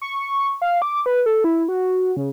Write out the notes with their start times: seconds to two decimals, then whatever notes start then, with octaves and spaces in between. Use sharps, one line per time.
0.01 C#6
0.19 C#6
0.62 F5
0.82 D6
1.06 B4
1.26 A4
1.44 E4
1.68 F#4
2.17 C#3